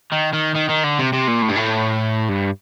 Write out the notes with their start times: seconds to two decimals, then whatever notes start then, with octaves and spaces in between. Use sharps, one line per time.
0.12 D#3
0.34 D#3
0.56 D#3
0.70 D#3
0.84 D3
0.99 C3
1.13 C3
1.27 A#2
1.42 A2
1.49 G2
1.56 A2
2.29 G2